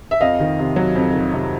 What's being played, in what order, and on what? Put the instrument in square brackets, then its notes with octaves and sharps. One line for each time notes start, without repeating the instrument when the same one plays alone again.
[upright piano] E5
F2 D#5 F5
D#3
C3
F#3
F2
D#3
C3